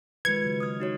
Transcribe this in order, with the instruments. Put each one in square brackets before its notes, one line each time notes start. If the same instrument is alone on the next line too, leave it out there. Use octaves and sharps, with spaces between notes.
[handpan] D#3 F3 G#3 [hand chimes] B4 C#7 [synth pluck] G#6
[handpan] C#3 F#3
[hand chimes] D#6 F6
D#4 F#4 C#5